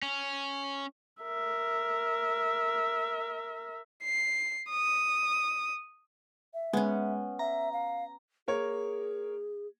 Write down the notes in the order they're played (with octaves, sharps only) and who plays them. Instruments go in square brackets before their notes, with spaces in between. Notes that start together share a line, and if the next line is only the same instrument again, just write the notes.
[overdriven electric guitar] C#4
[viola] A#4 E5
[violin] C7
D#6
[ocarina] E5
[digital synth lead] G#3 [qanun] B3 C#4
[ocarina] E5 [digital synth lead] A#5
[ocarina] F5
[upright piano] A#3 A#4 C#5 [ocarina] G#4